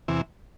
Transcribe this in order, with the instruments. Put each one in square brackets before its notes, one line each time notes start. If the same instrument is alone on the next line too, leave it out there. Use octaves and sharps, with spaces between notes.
[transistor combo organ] E2 C3 E3